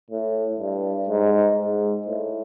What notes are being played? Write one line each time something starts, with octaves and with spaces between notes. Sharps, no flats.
A2
G2
G#2
G#2
A2